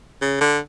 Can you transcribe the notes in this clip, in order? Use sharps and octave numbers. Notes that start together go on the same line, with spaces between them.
C#3
D3